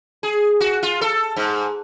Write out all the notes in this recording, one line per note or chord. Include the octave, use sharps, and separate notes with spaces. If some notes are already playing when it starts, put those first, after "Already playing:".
G#4
F#4
F4
A4
G#2